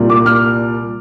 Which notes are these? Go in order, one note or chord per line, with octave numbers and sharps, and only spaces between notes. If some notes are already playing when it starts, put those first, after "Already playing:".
Already playing: C2 A#2 G3
D6
F6